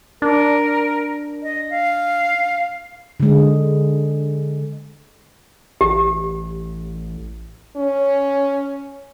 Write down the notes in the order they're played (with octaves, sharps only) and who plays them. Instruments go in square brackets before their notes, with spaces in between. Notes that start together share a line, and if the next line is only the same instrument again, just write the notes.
[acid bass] D4 [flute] A#4
[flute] D#5
F5
[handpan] D3 G#3
[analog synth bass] A1 [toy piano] G4
[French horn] C#4